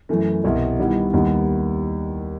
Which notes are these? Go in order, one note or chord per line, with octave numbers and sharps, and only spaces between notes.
F#2 E3 A3
C2 B2 G3
D#3 G3 B3 E4
D#2 D#3 G3 B3